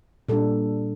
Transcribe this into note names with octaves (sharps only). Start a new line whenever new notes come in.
A#2 G3 D4 A4